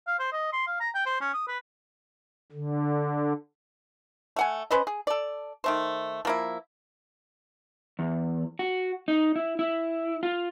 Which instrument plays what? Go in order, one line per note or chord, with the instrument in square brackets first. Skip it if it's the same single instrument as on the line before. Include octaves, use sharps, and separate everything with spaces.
[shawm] F5
C5
D#5
C6
F5
A#5
G5
C5
C#4
D#6
B4
[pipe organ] D3
[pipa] A3 F#5 G#5
C#4 B4 C5 D#5
G#4
A4 D5
D#3 A3 C5
F3 A#3 E4
[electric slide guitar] E2
F#4
D#4
E4
E4
F4